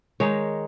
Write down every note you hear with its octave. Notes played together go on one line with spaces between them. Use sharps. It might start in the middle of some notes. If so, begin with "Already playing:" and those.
D#3 G#3 D#4 C#5